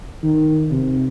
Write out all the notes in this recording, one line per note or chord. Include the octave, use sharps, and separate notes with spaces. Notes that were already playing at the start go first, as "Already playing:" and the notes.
D#3
C3